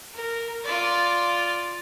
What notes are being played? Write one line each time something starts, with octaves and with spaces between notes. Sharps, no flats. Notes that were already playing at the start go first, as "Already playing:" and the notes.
A#4
F4 D5